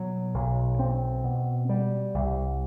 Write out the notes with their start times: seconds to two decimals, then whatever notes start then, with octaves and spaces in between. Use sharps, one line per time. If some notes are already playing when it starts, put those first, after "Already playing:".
Already playing: B2 F#3
0.34 B1
0.79 C4
1.24 B2
1.69 G3
2.14 C2